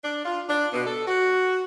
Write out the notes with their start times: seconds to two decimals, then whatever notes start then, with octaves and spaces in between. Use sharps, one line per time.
0.03 D4
0.25 F4
0.48 D4
0.73 B2
0.87 A4
1.07 F#4